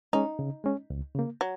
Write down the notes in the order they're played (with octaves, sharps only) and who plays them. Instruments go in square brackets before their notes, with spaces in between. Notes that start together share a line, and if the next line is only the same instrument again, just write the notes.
[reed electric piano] G#3 C#4 [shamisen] D#4
[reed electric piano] C#3
G#3 C#4
C#2
C#3 A#3
[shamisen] F#3